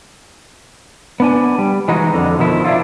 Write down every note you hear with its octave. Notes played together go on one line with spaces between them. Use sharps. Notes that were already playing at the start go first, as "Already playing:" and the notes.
B3 D4 G#5
G3
E3 G#3 D#4 F#4
F2 D3
B2 D#3 F3 E4
D4 E4 F4